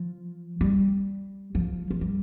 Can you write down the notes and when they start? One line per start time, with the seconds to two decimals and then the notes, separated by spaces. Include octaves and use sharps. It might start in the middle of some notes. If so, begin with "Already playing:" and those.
Already playing: F3
0.61 G3
1.55 F3
1.91 F3
2.01 G3